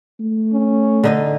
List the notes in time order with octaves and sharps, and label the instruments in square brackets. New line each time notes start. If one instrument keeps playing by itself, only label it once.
[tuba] A3
[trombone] C#4
[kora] D3 D#4 D#5